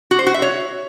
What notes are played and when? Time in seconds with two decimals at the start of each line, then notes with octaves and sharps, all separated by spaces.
0.11 F#4
0.19 C5
0.27 F#4
0.34 E5
0.42 C#5